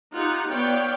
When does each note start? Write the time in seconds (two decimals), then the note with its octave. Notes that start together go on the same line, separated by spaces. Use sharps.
0.13 D#4 F4 G4 F#5
0.50 B3 C#5 D5 F5 G5